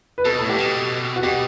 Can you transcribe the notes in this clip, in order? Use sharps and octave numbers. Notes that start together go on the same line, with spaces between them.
B4
B2 A4
A2 A4
G4
B2
F#4
B2 G4